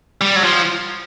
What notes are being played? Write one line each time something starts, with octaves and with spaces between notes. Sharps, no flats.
G3
F#3
F3